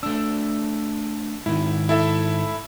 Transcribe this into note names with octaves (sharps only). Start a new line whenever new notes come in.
A3 D4 E6
G#2 D#3 E4
E4 A4 E5